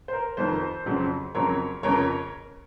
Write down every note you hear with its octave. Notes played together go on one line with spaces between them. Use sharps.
C5
A#4
F1 F2 D#3 A4 C5
F2 C#3 F#3 C4
F2 C#3 F#3 C4 A#4 C#5
F1 F2 C#3 A#4 C#5